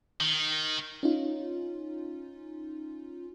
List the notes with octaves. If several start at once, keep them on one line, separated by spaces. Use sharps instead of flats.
D#3
C#4 D#4 F4